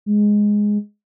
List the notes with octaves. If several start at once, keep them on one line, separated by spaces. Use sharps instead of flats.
G#3